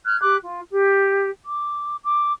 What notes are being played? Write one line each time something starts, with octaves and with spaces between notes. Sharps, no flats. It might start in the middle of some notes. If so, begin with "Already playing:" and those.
F6 F#6 G#6
G4 D6 F#6
F4
G4
D6
D6